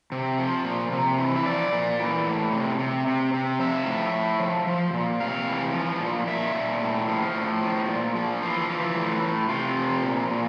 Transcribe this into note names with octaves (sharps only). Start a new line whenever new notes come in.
C3
F3
A#2
C3
E3
E5
F3 D5
A#2
E3
A2
C3
C3
C3
C3
F3 E5
A2
A2
F3
F3
A#2
C3 F5
E3
F3
A#2
A#2 E5
A#2
A2
F3
A2
F3
A#2
F3
E3 F4
E3
A2
A2
C3 F4
F3
A#2
A#2